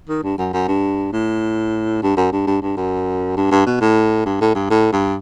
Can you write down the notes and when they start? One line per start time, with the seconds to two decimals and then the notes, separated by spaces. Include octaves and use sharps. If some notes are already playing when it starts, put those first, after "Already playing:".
0.09 D#3
0.23 G2
0.38 F#2
0.53 F#2
0.68 G2
1.13 A2
2.03 G2
2.17 F#2
2.32 G2
2.47 G2
2.62 G2
2.77 F#2
3.37 G2
3.51 G2
3.66 B2
3.81 A2
4.25 G2
4.41 A2
4.55 G2
4.70 A2
4.93 G2